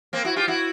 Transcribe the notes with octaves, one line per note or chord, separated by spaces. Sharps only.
A#3 C4
E4 F#4
F4 G4
E4 F#4